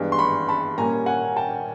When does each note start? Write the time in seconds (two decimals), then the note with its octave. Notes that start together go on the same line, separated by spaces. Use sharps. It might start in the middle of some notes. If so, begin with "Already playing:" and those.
Already playing: G2 E3 G#3 B3
0.12 C6
0.19 B5 C#6
0.49 A5 B5
0.78 A#2 G3 A#3 C#4 G#5 A#5
1.06 F#5 G#5
1.36 G5 A5